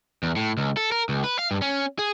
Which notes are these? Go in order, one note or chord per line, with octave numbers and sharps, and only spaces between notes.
E2
A2
C#2
A4
A#4
C#2
B4
F5
G2
C#4
G#4